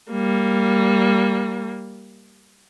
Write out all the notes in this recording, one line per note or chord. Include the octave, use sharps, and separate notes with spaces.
G3 A#3